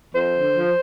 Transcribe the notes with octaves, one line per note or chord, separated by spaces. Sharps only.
F2 C5
D3
F3